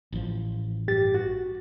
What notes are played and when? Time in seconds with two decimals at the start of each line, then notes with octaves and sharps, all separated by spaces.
0.13 A1 F3
0.88 G2 G4 A6
1.15 F#4